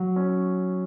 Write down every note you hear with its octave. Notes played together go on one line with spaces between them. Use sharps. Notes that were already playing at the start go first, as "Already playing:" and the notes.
Already playing: F#3
C#4